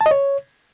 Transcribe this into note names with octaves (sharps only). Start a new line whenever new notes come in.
A5
D#5
C#5